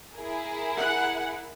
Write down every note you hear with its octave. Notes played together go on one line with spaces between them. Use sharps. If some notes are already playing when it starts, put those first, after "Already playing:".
E4 G#4 A#4
F#5